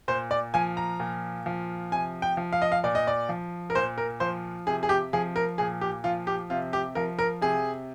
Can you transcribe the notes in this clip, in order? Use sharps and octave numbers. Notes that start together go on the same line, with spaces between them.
A#2 C5
D5
F3 G#5
A#5
A#2
F3
C3 G#5
G5
F3
F5
D#5
F5
A#2 D5
D#5
D5
F3
A#4
A#2 C5
A#4
F3 C5
C3 G#4
G#4
G4
F3 G#4
A#4
A#2 G#4
G4
F3 F4
G4
C3 F4
G4
F3 A#4
A#4
C3 G#4